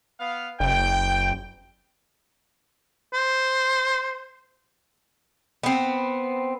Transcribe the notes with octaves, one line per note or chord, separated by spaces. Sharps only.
B3 F5
F#1 G5
C5
B3 C4